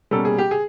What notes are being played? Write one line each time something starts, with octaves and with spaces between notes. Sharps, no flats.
B2 G3 A#3 C#4 A4
G#4
G4
G#4